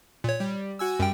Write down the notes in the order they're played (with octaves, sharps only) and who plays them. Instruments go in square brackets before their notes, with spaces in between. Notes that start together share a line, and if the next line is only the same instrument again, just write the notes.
[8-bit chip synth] A#2 C#5
[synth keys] G3
F#4 G#5 E6
[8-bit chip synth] F#2 G5 [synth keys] G3